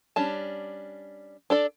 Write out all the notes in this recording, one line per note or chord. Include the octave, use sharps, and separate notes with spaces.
G3 C#4 D4 A5
D4 A4 D5